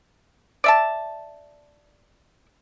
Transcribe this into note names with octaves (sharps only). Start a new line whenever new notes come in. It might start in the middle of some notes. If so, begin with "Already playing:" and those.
D5 E5 A5